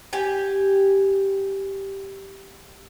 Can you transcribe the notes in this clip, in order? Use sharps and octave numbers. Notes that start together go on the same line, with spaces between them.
G4 G#5